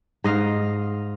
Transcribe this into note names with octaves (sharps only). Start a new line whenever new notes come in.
G#2 D#5 F5